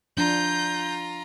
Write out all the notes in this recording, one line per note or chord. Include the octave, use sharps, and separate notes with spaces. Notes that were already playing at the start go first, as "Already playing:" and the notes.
F3 D4 F4 A#5 G6